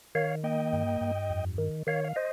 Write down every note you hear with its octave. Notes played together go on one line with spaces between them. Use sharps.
D#3 C#5 F5
A#3 D#5 G5
G2
G2
F2
D#3
D#3 C#5 F5
F5
C5 D#5